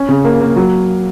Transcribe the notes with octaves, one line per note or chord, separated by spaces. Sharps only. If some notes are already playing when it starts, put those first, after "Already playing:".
Already playing: C#4
C#3
A#3
A#3
F#3